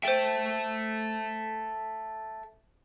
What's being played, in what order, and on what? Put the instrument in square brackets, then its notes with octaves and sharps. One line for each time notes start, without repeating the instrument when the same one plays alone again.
[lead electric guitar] A4 E5 [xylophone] C5 G5